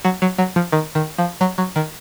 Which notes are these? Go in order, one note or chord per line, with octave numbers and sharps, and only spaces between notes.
F#3
F#3
F#3
F3
D#3
D#3
F3
F#3
F#3
D#3